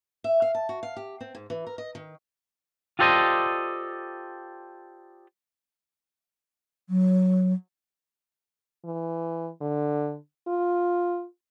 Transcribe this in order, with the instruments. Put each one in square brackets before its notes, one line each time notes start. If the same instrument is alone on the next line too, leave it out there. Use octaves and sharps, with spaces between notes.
[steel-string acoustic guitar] E5
F5
A5
F#4
F5
G4
C4
G#2
E3
A#4
D#5
D#3
[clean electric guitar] F4 G4 A4 C5 D5 D#5
[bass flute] F#3
[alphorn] E3
D3
F4